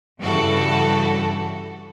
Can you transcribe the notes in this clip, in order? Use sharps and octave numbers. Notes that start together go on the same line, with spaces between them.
G2 C#3 E3 F#4 A4